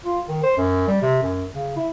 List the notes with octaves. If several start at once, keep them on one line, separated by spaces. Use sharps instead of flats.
F4
D#3
C5
F#2
G3
C3
F#2
C#3
E4